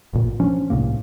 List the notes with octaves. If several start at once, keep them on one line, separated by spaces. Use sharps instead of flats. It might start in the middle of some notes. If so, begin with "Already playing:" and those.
A1 A#2
F3 C#4 D4
C2 A2 C3 A#3